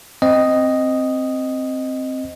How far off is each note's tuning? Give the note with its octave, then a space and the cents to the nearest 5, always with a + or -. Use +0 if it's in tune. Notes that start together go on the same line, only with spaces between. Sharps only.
C4 +0 D#5 +0